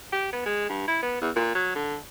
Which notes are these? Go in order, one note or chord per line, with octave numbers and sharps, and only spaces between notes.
G4
B3
G#3
G2
E4
B3
E2
A#2
F#3
D3